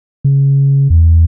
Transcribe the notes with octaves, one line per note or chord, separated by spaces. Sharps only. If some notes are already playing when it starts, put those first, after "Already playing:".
C#3
E2